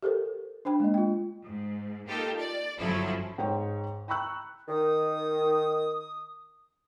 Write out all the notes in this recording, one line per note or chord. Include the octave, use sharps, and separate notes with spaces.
G4 A4 A#4 C5
D4 C5 G5 B5
G#3 A#3 D#5
F4 G5
G#2
A#3 D#4 F4 G4 A4
D5
G1 F3 F#3 C#4 E4 A4
G#2 G#3 C#5 G5
G5 A#5 B5 C#6 E6 F#6
D#3 D#6